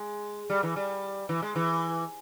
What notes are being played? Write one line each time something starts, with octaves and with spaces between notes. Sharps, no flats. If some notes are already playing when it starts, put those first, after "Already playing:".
Already playing: G#3
G3
E3
G3
E3
G#3
E3